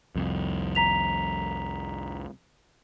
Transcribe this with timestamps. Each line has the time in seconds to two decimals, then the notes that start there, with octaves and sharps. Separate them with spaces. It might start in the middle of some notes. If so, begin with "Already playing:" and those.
0.16 C2 F2
0.75 A#5 B6 F7